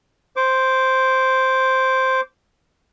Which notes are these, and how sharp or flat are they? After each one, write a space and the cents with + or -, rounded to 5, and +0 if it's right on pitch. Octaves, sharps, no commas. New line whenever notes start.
C5 +0 D6 -15